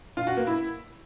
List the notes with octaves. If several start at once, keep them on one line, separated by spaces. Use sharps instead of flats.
F4
F#4
A#3
E4